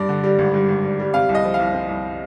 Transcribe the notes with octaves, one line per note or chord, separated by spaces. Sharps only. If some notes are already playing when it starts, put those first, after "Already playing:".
Already playing: G2 D5
D3
G3
G#1
G2
G#1
G3
G3
C3 F5
C2
D#5
F3
F5
C2
C4
C2